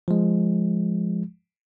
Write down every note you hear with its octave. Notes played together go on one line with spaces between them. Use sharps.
F3 G#3